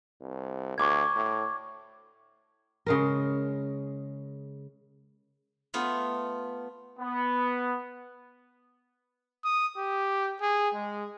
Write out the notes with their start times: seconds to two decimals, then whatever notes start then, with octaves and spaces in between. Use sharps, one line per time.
0.21 C2
0.78 D2 C#6 D6 G#6
1.16 A2
2.86 C#3 G#3 A#4
5.74 A3 B3 F4
6.99 B3
9.44 D#6
9.78 G4
10.41 G#4
10.74 G#3